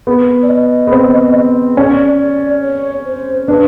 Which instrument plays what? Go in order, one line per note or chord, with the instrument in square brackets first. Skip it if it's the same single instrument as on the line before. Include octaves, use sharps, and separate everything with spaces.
[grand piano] B3
[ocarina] D5
D#5
[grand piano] B3
C4
[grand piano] C#4 [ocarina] D5
[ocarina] D5
C#5
C5
[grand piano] D4 [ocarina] B4